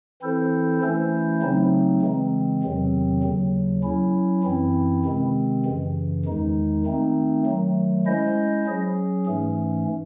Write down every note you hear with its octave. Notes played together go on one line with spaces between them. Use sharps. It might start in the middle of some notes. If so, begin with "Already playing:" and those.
E3 C4 E4 A4 C5
E3 A3 C#4 E4 C5
C#3 F#3 A3 C4 D#4
C#3 E3 G#3 C4
E2 C3 D#3 F#3 C4
D#2 C#3 F#3
F#3 C#4 E4
F#2 E3 C4 E4
C3 D#3 G#3 C4
F#2 C#3 E3
E2 D#3 G#3 D#4
D#3 A3 C4 D#4
D#3 F#3 A3
G#3 C#4 E4 C5 D#5
F#3 C#4 G#4
G#2 E3 A3 C#4